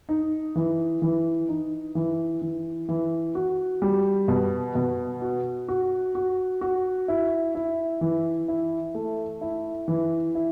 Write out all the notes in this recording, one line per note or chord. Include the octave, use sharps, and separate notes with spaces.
D#4
E3
E3
D#4
E3
E3
E3
F#4
G3
B2
B2
F#4
F#4
F#4
F#4
E4
E4
E3
E4
A3
E4
E3
E4